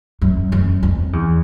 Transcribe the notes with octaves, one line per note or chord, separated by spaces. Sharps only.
F#2
F#2
F2
E2